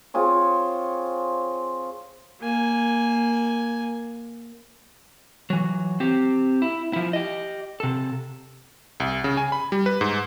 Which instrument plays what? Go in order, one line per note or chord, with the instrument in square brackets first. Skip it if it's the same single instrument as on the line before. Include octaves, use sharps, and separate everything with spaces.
[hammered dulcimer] C4 F4 G#4 C#5
[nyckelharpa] A#3 G#5
[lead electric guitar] E3 F#3
C4 G4
E4
F3 E4
G4 D#5
C3 A4
[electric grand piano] C2
C#3
G#5
B5
G3
B4
G#2